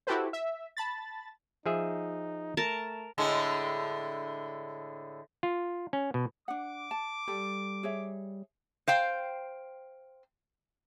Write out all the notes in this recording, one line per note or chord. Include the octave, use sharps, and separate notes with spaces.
E4 F#4 G4 A4 B4 C5
E5
A5 B5 A6
F3 D#4 G#4 E5
A3 A#4 A5
A2 D3 G#3
F4
C#4
B2
D4 F#5 D6
A5
G3 A4
G#4 C#5 E5
C5 F5 G5